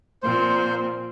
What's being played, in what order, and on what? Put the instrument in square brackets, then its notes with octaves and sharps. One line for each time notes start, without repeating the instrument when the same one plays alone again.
[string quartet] A#2 F3 C4 [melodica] C5